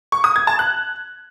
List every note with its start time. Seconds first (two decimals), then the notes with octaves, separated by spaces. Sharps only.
0.12 C#6
0.24 D#6
0.36 G#6
0.47 A5
0.59 F#6